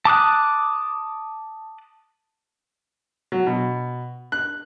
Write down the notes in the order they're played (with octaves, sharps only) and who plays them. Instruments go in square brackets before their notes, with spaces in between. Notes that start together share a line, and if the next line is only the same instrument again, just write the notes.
[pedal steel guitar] A5 D6 D#6 F#6
[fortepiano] F#3
B2
F#6